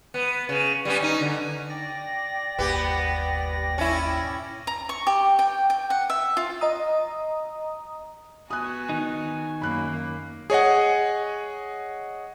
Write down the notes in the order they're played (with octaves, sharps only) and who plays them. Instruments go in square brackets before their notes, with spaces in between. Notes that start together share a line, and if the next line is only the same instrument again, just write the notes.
[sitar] B3
C#3
G3 B3 C#4
C#4 D#4
D3
[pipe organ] D5 A#6 [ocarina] G5
[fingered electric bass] G1 D#2 A#2 [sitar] B3 G4
[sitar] C#4 E4
[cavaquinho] A#5
C#6
G4
G5
G5
F#5
E5
F4
[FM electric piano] D#5 A#5 D#6
[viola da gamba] B3 F#4 [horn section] G#5 [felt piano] D#6 F#6
[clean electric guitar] D#3 D#4
[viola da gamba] F#2 A#3 [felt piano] B5 F#6
[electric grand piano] G#4 C#5 D#5 F#5